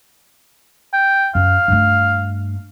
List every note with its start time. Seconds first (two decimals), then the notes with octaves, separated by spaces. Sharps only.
0.94 G5
1.35 F#2 F5
1.68 G2 A3